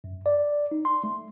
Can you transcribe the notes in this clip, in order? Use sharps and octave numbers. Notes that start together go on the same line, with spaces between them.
F#2
D5
D#4
C6
A3